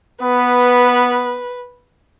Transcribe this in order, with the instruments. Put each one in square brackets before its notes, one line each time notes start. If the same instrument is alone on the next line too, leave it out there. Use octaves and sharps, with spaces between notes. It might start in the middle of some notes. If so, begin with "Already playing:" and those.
[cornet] B3 [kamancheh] B4